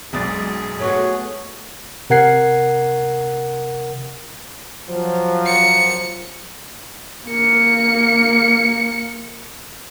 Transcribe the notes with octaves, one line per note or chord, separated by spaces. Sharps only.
F#1 B1 G#3 G#4 D5 A6
A3 B3 F#4 C#5
C3 A#4 F#5 G#6 C7
F3 F#3
C#7
A#3 C#7